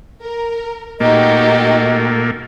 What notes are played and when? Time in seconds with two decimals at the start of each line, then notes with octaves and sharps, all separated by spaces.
0.22 A#4
1.00 A#2 A3 A#3 D#4 F#4 G4 D#5